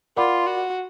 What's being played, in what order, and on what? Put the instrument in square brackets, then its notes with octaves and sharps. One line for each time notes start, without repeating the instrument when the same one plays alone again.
[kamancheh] F4 [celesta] A#4 D5 F#5 B5 D6
[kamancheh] F#4